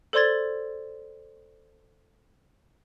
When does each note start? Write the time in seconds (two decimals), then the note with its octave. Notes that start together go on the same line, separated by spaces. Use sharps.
0.13 A4 C5 D5 C6 G#6 A6